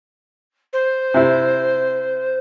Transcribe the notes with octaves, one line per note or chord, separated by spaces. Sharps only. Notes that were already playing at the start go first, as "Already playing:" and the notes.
C5
C3 E4